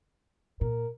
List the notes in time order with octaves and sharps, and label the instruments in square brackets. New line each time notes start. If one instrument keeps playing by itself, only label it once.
[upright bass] A#2 [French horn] A#4